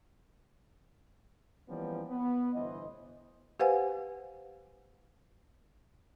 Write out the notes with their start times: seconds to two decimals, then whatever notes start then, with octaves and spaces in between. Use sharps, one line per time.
1.69 E3 F3 G3 A#3 B3 C#4
2.10 B3
2.54 G1 A2 E3 C5 D#5
3.59 G4 B4 C5 F5 F#5 G#5